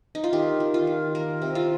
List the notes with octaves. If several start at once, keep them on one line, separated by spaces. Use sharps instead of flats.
D#4
F4
D#3 G4
D#3
F4
D#3
A#3 A#4
C3
F4